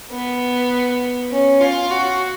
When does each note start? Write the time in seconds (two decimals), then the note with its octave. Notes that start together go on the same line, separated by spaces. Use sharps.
0.11 B3
1.31 C#4
1.61 F4
1.90 F#4